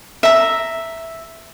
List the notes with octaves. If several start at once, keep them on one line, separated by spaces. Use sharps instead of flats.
E5 A#5